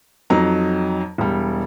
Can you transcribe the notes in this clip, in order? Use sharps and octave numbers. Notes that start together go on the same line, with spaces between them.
F2 F#3 D#4 A#5
E1 G3